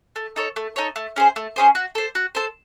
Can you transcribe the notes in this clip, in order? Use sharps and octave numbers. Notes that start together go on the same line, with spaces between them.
A3
D#4 A4 C#5
A3
D#4 A4 C#5
A3
C#4 G#4 C5
A3
C#4 G#4 C5
F#4
A4 C5
F#4
A4 C5